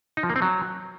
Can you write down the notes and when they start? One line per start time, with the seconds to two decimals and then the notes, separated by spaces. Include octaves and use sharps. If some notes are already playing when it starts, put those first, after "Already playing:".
0.17 D#4
0.23 F3
0.30 A#3
0.36 C4
0.42 F#3